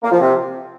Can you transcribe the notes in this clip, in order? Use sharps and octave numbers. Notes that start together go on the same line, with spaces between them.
A#3
F3
C3